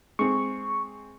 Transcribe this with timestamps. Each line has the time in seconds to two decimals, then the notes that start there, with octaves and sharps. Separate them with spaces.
0.19 G#3 C4 C#6